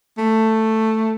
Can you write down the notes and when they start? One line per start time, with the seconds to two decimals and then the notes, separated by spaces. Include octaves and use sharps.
0.18 A3